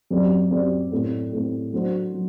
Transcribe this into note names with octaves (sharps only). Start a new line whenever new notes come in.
F#2 F#3 C4 G4 D5
F#2 F#3 C4 G4 D5
A2 A3 C4
A2 A3 C4
F#3 A3 D4 F#4 C5
F#3